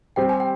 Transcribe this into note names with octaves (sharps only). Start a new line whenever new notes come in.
G3 C4 G4 C5 G5
G#5
G5